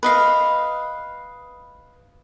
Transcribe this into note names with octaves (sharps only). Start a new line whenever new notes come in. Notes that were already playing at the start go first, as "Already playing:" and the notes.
B4 D#5 F5